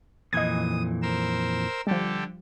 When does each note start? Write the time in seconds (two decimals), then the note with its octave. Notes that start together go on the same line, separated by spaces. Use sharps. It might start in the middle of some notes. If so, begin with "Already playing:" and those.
0.33 F2 A#2 E3 D#5 D#6 G#6
1.02 A#4 C5 E6
1.87 D3 F3 G3 G4 A4